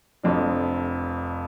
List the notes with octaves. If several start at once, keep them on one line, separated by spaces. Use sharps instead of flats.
F1 F2 F3 D4